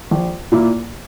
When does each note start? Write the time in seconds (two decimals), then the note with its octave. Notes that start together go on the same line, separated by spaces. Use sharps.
0.11 A#1
0.52 A#2 A#3 E4